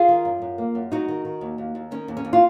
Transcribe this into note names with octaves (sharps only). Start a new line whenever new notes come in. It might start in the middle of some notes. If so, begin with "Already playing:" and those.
Already playing: F4 G#4
D#3
F#2
F#2
A#3
F#2
F#3 D#4 F#4
D#3
D#3
D#2
D#2
D#2
D#3 C#4
D#2
C#4
D#2
F4